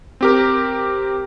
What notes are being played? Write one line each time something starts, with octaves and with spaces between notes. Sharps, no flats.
C4 G4 A#4